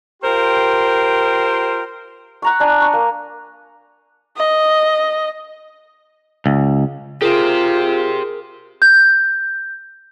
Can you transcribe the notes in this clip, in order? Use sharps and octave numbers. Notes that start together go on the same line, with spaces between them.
F4 G4 A#4 C5 G5 C6
F#5 A#5 C#6
D4 G#5
C#6
A#3
D#5
C#2
F4 G4 G#4 A#4 C5
G6